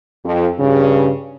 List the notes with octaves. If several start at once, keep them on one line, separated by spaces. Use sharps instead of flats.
F2
G2 C#3